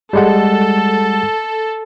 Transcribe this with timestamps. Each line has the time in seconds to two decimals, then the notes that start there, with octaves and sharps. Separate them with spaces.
0.13 G3 G#3 A4 F#5